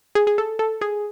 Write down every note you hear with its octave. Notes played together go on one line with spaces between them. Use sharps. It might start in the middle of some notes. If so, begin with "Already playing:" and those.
G#4
G#4
A4
A4
G#4